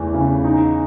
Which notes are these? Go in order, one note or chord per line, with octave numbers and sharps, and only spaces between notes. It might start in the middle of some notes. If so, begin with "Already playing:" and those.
Already playing: E2 E3 A3
C#3
D#4